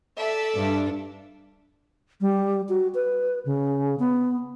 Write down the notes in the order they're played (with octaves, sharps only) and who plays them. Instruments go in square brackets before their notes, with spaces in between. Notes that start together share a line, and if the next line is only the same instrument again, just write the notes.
[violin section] A4 D5 E5
[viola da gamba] G2 D4
[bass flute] G3
F#4
B4
C#3
B3